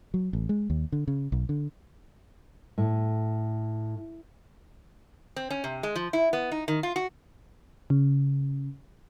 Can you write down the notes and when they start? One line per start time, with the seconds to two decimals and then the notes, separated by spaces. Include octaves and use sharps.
0.14 F#3
0.33 A1
0.49 G#3
0.70 D#2
0.92 D3
1.08 C#3
1.32 B1
1.49 D3
2.78 A2
5.36 C4
5.50 C#4
5.64 C3
5.83 G#3
5.95 F3
6.13 E4
6.33 B3
6.52 D#4
6.68 D#3
6.83 F4
6.96 F#4
7.90 C#3